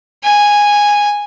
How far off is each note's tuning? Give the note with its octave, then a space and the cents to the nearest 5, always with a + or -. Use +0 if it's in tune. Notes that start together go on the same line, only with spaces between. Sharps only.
G#5 -10